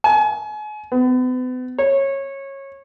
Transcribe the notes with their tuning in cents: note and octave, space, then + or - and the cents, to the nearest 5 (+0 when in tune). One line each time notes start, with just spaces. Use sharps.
G#5 +35
B3 +40
C#5 -20